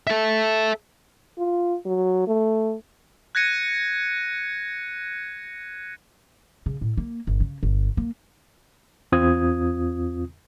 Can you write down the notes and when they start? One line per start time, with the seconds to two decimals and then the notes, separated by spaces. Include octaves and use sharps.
0.07 A4 E5
1.38 F4
1.86 F#3
2.27 A3
3.35 F#6 G#6 A#6 C#7 D#7
6.66 C#3
6.81 A2
6.97 A#3
7.27 G1
7.40 C#3
7.63 G1
7.97 A#3
9.12 E2 C4 F4 D#6 G#6